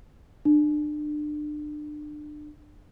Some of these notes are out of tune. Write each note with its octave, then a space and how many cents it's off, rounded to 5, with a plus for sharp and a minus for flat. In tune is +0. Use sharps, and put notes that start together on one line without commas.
D4 +30